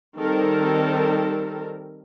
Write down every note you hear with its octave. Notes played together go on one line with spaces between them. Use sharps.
D#3 G3 C4 A4 A#4